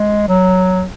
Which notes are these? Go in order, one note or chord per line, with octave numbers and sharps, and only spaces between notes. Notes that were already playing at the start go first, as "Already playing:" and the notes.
Already playing: G#3
F#3